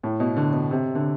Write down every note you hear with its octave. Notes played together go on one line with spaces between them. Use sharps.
A2
B2
D3
B2
C3
D3